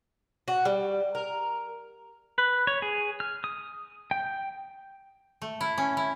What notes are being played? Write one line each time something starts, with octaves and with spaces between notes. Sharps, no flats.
F#4
G3
A#4
B4
C#5
G#4
F6
D#6
G5
A3
E4
C#4
E4